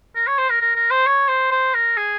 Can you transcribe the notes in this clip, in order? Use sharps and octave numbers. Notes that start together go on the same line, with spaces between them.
A#4
C#5
C5
A#4
A#4
A#4
C5
C#5
C5
C5
A#4
G#4